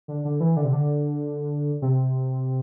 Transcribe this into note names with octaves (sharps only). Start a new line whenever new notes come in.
D3
D3
E3
D3
C3
D3
C3